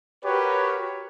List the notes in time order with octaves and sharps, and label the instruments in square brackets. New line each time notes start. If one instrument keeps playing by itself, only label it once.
[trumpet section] F#4 G4 A#4 B4 C#5